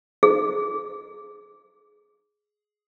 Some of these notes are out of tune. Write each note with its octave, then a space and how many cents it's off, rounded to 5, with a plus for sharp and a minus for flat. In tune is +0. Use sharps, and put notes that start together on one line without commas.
G#4 +10